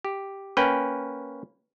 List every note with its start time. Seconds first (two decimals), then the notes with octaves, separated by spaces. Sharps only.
0.05 G4
0.57 A#3 C#4 B4 G5